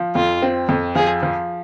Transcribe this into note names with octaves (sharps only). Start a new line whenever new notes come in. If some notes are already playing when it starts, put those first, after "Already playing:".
Already playing: F3
F2 F4
C4
F2
F3 G#4
F3